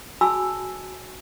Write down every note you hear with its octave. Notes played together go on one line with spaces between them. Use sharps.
F#4 G#4 G#5 A5 B5 E6